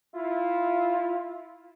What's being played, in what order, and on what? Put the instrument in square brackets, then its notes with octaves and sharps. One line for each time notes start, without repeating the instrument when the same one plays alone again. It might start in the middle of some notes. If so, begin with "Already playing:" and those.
[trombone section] E4 F4